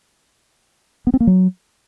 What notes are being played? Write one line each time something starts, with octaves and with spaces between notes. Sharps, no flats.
B3
C4
A#3
F#3